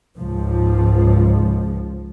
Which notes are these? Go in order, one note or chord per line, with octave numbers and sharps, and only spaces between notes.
C#2 G#2 F3